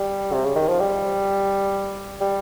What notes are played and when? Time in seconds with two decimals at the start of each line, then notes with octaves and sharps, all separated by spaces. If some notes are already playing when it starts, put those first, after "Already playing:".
Already playing: G3
0.33 C3
0.45 C#3
0.56 D#3
0.69 F3
0.80 G3
2.21 G3